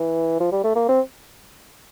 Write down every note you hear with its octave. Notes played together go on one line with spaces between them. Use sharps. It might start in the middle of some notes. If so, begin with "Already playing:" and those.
Already playing: E3
F3
G3
A3
A#3
C4